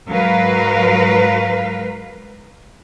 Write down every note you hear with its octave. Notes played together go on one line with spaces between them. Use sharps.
G#2 F#3 A#4 B4 F5